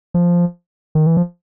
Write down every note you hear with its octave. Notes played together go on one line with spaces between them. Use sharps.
F3
D#3
E3
F3